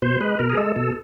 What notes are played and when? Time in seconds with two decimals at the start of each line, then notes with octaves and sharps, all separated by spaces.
0.02 B2 C5
0.20 G#3 B4
0.39 B2 A#4
0.50 G#4
0.57 G#3 A4
0.76 B2 A4